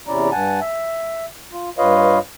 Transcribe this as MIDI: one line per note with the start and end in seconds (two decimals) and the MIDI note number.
0.07 0.30 40
0.07 0.30 48
0.07 0.30 61
0.07 0.30 64
0.07 0.30 74
0.07 0.30 82
0.32 0.60 43
0.32 0.60 78
0.32 0.60 80
0.32 0.60 81
0.61 1.26 76
1.52 1.70 65
1.78 2.19 43
1.78 2.19 65
1.78 2.19 71
1.78 2.19 73
1.78 2.19 75
1.78 2.19 77